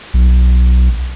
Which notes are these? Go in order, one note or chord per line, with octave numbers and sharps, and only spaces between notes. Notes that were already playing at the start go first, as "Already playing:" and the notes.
B1